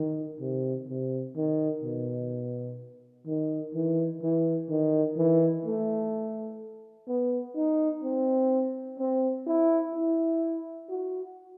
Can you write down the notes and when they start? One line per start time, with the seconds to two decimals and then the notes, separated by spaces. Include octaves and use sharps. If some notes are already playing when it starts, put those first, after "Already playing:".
Already playing: D#3
0.41 C3
0.89 C3
1.36 D#3
1.84 B2
3.27 D#3
3.74 E3
4.22 E3
4.70 D#3
5.17 E3
5.65 A3
7.08 B3
7.56 D#4
8.03 C4
8.99 C4
9.47 E4
9.94 E4
10.90 F#4